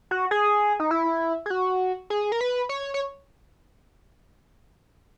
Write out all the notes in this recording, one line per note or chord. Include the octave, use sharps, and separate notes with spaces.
F#4
G#4
D#4
E4
G#4
F#4
G#4
A#4
B4
C#5
C#5